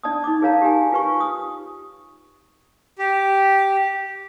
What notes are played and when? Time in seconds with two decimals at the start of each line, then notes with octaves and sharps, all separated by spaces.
0.04 D4 D5 A5 D#6
0.24 D#4 D6
0.42 G#4 A#4 C#5 F5 A5 A#5
0.62 G4 G#5
0.92 F4 G4 B4 G#5 C#6
1.20 D#6
2.99 G4